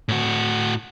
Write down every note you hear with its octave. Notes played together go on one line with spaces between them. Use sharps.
A2 F#4